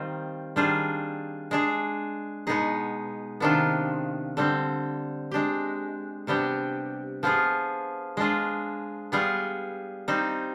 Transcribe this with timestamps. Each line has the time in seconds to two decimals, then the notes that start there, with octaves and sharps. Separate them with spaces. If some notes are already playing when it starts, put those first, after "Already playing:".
Already playing: D#3 G3 C4 F4
0.56 D#3 G3 D4 F4 G#4
1.51 G#3 D4 G#4
2.47 B2 G#3 B3 D#4 G#4
3.40 C3 D#3 B3 D4 F4
4.37 D3 G3 C4
5.32 G#3 D4 G4
6.27 C3 G3 B3 D4 G4
7.23 F3 B3 F4 G#4
8.17 G#3 D4 F4 G#4
9.12 G3 B3 F4 G#4
10.08 G3 C4 D#4